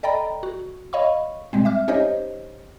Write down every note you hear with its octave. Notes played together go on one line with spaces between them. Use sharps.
A4 D5 D#5 G5 A#5 B5
F#4
C#5 D#5 F5 B5 C#6
B2 G3 G#3 C4
E5 D6 F6
C#4 D#4 G4 C5 C#5 D#5